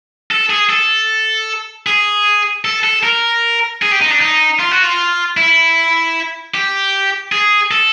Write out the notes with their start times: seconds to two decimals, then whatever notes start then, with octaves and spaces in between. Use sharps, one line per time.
0.31 A4
0.50 G#4
0.70 A4
1.87 G#4
2.65 A4
2.84 A4
3.03 A#4
3.82 G#4
3.91 G4
4.01 D#4
4.11 D4
4.21 D#4
4.59 F4
4.71 F#4
4.83 F4
5.37 E4
6.55 G4
7.32 G#4
7.71 A4